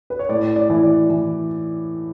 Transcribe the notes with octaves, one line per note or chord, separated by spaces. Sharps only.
B4
C#5
A2 D5
D5
E3
D5
E3